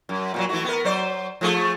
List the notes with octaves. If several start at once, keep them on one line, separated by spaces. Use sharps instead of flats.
F#2
A#2 C#3 F#3
E3 A3 F#4
B3 A#4
F#3 C5 D5
F3 A3 G#4